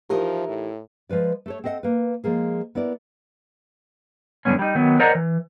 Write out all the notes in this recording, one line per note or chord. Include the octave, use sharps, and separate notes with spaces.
E3 F3 D#4 G4 A#4
A2
F3 G#3 B4 D5
A3 A4 C#5
C4 A4 D#5 E5 F#5
A#3 B4
F3 G#3 A#3 G#4
B3 E4 A#4 D5
F#2 D3 D#3 G3 B3 C#4
G3 D#4
D#3 F#3 B3
A#4 C5 D5 D#5 F#5 A#5
E3